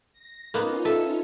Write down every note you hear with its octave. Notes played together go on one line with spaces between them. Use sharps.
A#6
A#3 B3 C#4 D#4 F4
A4 E5